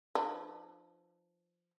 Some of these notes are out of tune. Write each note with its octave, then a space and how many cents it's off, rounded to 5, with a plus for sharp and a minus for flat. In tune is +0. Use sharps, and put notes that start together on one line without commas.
F3 +0 D#4 -45 B4 +5